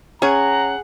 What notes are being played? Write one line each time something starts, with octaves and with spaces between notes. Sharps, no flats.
C#4 G#4 C#5 F#5 A#5